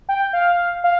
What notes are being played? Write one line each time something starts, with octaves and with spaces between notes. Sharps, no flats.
G5
F5
F5